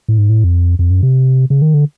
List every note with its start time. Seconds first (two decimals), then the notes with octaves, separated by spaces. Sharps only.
0.08 A2
0.18 G#2
0.29 A2
0.44 F2
0.79 F2
0.90 F#2
1.03 C3
1.50 C#3
1.62 D#3
1.74 D3